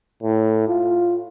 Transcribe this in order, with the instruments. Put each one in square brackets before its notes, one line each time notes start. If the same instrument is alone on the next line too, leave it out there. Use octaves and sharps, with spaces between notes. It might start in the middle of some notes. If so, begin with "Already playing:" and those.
[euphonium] A2
F4